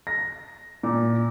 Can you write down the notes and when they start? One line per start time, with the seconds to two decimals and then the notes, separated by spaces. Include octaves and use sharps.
0.07 A#6
0.83 A#2